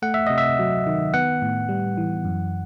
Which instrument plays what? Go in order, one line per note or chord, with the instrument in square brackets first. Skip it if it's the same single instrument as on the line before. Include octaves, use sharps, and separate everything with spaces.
[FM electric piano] A3 [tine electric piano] F#5
[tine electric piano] E5
[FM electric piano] C3 [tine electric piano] D#5
[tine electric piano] E5
[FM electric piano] F#3
D#3
[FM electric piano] B3 [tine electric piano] F#5
[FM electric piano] A2
G3
E3
F#2